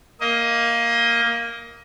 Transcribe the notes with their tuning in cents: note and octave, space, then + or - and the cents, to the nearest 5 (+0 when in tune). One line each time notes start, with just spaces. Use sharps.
A#3 +0 D#5 +25